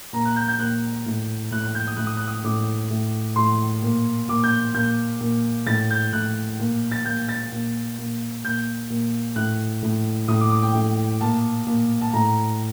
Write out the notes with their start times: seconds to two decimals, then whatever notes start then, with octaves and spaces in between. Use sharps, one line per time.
0.13 A#2 A#5
0.25 F#6
0.36 G6
0.48 G6
0.59 A#2 F#6
1.06 A2
1.51 A2 F#6
1.63 F#6
1.75 G6
1.87 D#6
1.97 A2 F#6
2.06 D#6
2.17 F#6
2.27 D#6
2.44 A2 D6
2.91 A2
3.36 A2 C6
3.82 A#2
4.29 A#2 D6
4.44 G6
4.74 A#2 G6
5.21 A#2
5.67 A2 A6
5.91 G6
6.13 A2 F#6
6.59 A#2
6.92 A6
7.05 A#2 G6
7.29 A6
7.52 A#2
7.98 A#2
8.45 A#2 G6
8.90 A#2
9.36 A2 F#6
9.83 A2
10.28 A2 D#6
10.40 D6
10.52 D6
10.63 G5
10.75 A2
11.21 A#2 A5
11.67 A#2
12.01 A5
12.13 A2 A#5